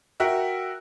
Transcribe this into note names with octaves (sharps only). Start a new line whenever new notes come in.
F#4 A#4 E5 G5